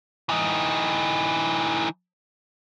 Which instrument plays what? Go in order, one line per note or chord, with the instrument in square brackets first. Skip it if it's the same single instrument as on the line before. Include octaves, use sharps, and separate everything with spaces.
[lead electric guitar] E3 D#4